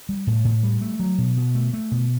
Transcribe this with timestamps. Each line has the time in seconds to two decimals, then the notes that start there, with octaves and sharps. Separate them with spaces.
0.09 G3
0.27 A2
0.45 A2
0.63 G3
0.81 A3
0.99 F#3
1.18 B2
1.37 B2
1.55 A3
1.73 A3
1.91 B2